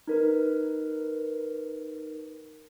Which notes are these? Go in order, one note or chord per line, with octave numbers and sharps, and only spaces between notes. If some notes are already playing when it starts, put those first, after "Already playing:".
D#4 A#4 B4